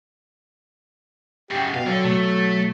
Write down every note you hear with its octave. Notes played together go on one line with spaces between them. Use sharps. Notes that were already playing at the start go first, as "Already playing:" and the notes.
F#2 C#3 G4
B2 F5 G5
F#3 D4 A4
B2 A3